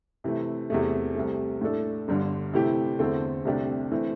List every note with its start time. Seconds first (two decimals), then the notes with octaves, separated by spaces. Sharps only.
0.24 C3 E3 A3
0.70 E2 C3 A3
1.15 C2 C3 A3
1.61 A2 A3 D4 A4
2.08 G1 G2 D3
2.53 C3 E3 A3 E4 G4
2.99 E2 D3 A3 C4 A4
3.45 C2 C3 A3 D4 G4
3.91 E3 A3 C4